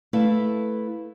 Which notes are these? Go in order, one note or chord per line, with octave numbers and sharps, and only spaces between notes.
A3 E4 A4 B4 F5